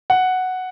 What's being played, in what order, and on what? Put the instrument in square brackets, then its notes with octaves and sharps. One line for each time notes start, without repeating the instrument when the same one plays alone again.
[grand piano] F#5